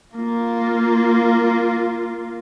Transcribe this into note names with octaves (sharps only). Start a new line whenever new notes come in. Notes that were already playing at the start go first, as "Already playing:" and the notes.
A#3 F4